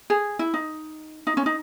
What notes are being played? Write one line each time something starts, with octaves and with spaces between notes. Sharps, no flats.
G#4
E4
D#4
D#4
C#4
D#4